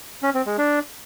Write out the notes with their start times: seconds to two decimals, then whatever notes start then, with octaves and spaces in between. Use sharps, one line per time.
0.23 C#4
0.34 C4
0.46 G#3
0.58 D4